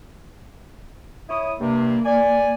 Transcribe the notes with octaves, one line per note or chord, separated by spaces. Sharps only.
E4 C#5 D#6
G2 C3 A#3
D5 G#5